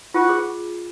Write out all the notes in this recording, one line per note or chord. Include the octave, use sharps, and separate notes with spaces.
F4 F#4 B4 F#5
G#4